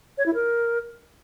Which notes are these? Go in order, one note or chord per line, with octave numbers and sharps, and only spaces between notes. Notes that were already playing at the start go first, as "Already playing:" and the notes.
C#5
E4
A#4